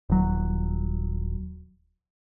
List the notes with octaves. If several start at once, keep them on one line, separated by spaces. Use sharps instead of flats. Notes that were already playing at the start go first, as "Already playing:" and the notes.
D#1 F#3